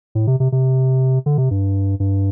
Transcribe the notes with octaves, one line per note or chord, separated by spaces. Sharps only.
A2
C3
C3
C3
D3
C3
G2
G2